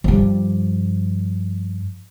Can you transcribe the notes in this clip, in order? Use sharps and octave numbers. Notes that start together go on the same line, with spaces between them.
G2 F3